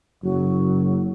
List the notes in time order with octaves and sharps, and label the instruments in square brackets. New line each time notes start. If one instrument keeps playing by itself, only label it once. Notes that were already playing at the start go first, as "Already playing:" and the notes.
[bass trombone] F#1 [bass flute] F#3